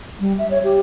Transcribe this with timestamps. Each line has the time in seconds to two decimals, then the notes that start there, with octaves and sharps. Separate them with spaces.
0.20 G3
0.38 E5
0.51 C#5
0.64 G4